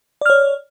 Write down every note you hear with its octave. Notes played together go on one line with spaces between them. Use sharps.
C#5 D5 F6